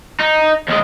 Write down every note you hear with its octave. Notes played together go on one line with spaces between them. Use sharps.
D#4
D#2 G#3